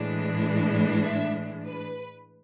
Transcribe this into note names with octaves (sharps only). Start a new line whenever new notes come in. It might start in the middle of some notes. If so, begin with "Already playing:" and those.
Already playing: A2 E3 G#3 D4
E5
B4